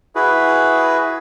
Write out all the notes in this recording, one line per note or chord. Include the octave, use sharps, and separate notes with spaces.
E4 F#4 G#4 B4